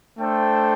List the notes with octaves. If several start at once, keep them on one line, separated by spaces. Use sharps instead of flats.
A3 D4 A4 C5 G5